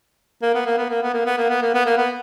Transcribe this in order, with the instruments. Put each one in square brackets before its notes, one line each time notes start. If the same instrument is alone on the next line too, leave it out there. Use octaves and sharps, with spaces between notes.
[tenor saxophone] A#3
B3
A#3
B3
A#3
B3
A#3
B3
A#3
B3
A#3
B3
A#3
B3